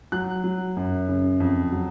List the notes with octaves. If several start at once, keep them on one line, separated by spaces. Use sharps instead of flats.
F#3 F#6
F#3
F#2
C#3
F2
F#3